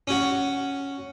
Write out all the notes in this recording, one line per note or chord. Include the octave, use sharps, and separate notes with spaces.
C#4 F#4